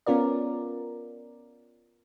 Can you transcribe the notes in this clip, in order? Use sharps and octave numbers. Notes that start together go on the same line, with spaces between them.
B3 C#4 F4 A#4 D5